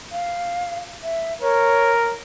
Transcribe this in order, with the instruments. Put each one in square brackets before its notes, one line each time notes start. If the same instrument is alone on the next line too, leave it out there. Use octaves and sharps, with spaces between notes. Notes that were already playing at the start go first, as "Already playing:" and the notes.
[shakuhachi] F5
E5
[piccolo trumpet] A#4 [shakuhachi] C#5